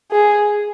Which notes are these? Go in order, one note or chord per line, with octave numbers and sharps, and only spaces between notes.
G#4